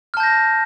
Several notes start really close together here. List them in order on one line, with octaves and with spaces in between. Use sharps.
F6 A5 G6 A#6